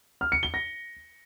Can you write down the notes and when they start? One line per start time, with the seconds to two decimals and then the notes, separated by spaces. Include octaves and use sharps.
0.21 F6
0.32 C#7
0.43 G7
0.54 A#6